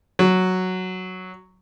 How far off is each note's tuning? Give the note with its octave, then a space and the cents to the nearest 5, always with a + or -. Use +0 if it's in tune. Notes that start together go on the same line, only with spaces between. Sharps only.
F#3 +0